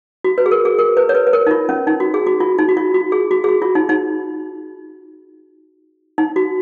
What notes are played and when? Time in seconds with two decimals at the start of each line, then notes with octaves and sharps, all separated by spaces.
0.24 F#4
0.38 B4
0.46 G#4
0.51 A#4
0.65 G#4
0.79 A#4
0.97 B4
1.09 C#5
1.15 B4
1.27 B4
1.33 A#4
1.46 D#4
1.51 F4
1.69 C#4
1.87 D#4
2.00 F#4
2.14 G#4
2.27 F#4
2.40 F4
2.58 D#4
2.69 F#4
2.77 F4
2.94 F#4
3.12 G#4
3.31 F#4
3.44 G#4
3.48 F#4
3.62 F4
3.75 D#4
3.89 D#4
6.18 D#4
6.36 F#4